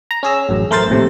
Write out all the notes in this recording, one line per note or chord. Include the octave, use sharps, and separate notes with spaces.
A#5
C#4 G#4 E6
A1 F#2
A3 A#4 C5 A6
A#1 D#2 A2 C3